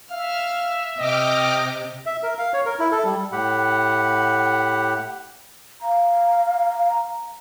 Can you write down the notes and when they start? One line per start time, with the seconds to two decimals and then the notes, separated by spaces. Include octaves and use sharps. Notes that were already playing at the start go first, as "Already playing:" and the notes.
0.11 E5 F5 F6
0.99 C3 D#5 G5 D6 F6
2.06 E5
2.23 A#4
2.39 F5
2.54 C#5
2.66 A#4
2.79 E4
2.92 A4
3.05 G3
3.32 A2 G4 F#5 B5
5.83 F5 A#5